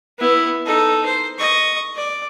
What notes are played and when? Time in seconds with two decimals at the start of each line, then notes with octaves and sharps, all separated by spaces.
0.18 B3 E4
0.66 D#4 A4
1.05 C5
1.38 D#5 C#6
1.96 D5